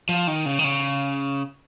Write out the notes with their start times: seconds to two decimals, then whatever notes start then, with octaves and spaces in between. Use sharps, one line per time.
0.09 F3
0.27 D#3
0.46 C#3
0.59 D#3
0.64 C#3